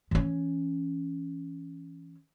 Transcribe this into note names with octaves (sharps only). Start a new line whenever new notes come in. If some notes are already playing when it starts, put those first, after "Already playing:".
E3 C#4